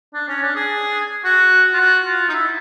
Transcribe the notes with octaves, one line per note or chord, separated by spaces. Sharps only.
D4
C#4
D4
G#4
F#4
F4
F#4
F4
D#4
E4